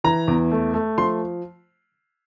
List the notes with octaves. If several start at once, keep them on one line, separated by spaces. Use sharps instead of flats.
E3 A#5
E2
A3
A3
F3 C6